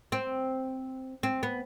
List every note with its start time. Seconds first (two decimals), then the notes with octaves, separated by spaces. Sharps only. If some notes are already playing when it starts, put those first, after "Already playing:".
0.12 C4
1.23 C4
1.43 B3